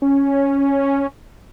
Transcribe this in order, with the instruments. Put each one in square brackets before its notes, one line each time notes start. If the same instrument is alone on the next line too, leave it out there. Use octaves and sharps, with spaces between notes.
[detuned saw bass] C#4